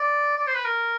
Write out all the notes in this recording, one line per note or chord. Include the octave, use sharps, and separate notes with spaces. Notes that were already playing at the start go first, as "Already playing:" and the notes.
Already playing: D5
D5
C5
B4
A#4